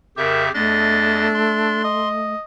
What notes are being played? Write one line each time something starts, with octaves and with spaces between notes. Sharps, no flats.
F2 C#3 G4 A#4 E5
E2 A3 D4 D#5 A6
C6
D#5